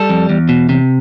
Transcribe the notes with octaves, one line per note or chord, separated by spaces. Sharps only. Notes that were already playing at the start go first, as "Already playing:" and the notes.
Already playing: G3 A4
F2
E2
B2
C3